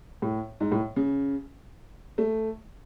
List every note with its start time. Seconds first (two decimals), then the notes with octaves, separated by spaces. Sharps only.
0.22 A2
0.60 G#2
0.72 A2
0.96 C#3
2.18 A3